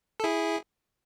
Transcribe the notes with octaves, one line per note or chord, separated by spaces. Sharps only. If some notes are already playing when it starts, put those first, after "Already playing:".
A4
E4 G#4